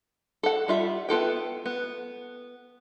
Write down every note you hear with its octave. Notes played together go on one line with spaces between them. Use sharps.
A4 F#5
G3 F4 E5
B3 F4 A4 G5
B3